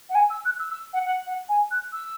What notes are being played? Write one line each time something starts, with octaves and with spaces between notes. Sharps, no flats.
F#5
G#5
E6
F#6
E6
E6
F#5
F#5
F#5
G#5
F#6
E6